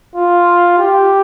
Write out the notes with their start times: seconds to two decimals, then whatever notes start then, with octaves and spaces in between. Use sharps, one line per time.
0.16 F4
0.78 G4